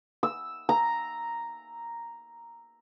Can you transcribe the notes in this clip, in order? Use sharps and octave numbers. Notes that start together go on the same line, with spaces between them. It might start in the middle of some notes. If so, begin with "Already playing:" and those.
E6
A#5